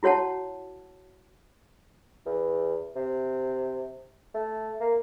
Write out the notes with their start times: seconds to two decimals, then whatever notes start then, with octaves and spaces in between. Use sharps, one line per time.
0.03 E4 F#4 C#5 F#5 A5
2.26 E2
2.96 C3
4.34 A3
4.80 A#3